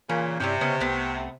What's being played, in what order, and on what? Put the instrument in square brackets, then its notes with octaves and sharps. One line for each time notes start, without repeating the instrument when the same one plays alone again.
[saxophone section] A#2 C#3 [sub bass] E3 [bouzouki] C#4
[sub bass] G2 [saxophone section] C3 [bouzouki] G3 C#4 E4
[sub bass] C#3 [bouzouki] B3 C#4 D#5
[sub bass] C2 [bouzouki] A3 B3